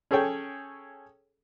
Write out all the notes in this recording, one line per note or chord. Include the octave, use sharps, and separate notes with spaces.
C#4 G#4 A4 C#5 G5